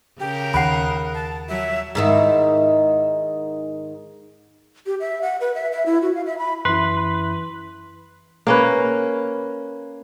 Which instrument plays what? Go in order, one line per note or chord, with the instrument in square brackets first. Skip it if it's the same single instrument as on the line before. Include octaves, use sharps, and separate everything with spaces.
[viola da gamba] C#3 A#4 [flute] G4
[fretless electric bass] D#2 [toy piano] F#5 B5 [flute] F#6
[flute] A5
[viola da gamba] F#3 [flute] E5
[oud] G#2 D#3 E4
[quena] G4
E5
F#5
B4
E5
E5
E4
F#4
F5
E5
B5
[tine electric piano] F#2 E3 E4 [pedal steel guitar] B4 [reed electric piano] C6
[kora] A#3 C#4 B4